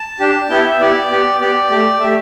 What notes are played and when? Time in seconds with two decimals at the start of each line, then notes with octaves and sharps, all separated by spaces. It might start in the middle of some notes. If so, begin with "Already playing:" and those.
Already playing: A5
0.20 D4 G4
0.50 B3 E4 G4 G5
0.66 E5
0.79 B3 E4 G4 D5
1.11 B3 G4
1.40 B3 G4 D5
1.70 A3 G4
2.00 A3 G4 E5